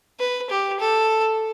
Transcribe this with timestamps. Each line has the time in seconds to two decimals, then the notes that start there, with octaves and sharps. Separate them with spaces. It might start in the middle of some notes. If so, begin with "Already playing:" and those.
0.20 B4
0.50 G4
0.80 A4